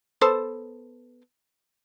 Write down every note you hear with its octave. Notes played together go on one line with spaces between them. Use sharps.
B3 A4 C5